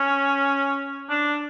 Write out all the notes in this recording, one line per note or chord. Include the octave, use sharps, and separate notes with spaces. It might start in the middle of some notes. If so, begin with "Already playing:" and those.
Already playing: C#4
D4